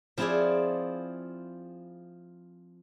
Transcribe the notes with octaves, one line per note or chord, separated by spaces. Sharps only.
F3 C4 E4 F4 G#4 D5